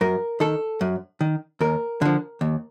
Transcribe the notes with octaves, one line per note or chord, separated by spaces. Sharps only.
F#2 A#4
D#3 A4
F#2
D#3
D#2 A#4
D3 F3
D#2